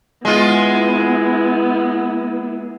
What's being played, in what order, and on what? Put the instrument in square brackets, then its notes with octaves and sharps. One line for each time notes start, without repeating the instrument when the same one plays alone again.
[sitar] G#3 F4 [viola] B3 E4